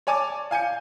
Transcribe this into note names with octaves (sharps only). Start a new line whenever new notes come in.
C#5 D5 G#5 A5 D6
F5 G#5 G6 C#7